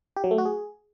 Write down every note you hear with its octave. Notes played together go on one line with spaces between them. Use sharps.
G4
F#3
A3
F#4
G#4